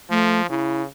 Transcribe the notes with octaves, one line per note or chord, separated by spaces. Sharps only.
F3 A3
C#3 E4